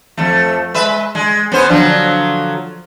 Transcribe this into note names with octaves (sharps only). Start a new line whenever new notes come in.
F2 A3
G#3 B4 E5
G#3
B3 C#4 C5
D3 F3 F#3